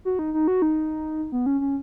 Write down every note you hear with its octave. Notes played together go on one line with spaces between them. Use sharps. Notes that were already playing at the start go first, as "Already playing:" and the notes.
F#4
D#4
D#4
F#4
D#4
B3
C#4
C#4